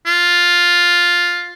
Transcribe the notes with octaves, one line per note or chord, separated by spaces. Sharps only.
F4